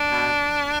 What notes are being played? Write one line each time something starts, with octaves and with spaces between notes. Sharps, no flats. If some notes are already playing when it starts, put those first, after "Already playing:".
Already playing: D4
B2